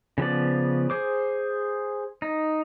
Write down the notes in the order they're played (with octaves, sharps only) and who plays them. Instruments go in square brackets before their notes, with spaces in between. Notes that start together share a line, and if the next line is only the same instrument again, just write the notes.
[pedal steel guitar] C#3 F3 B3 D5
G#4 C5 D6
D#4